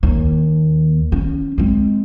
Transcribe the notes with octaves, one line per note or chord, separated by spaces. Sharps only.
D#2
C#4
G#3 C4